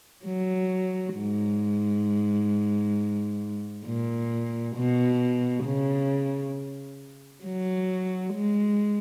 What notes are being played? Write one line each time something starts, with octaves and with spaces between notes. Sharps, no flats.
F#3
G#2
A#2
B2
C#3
F#3
G#3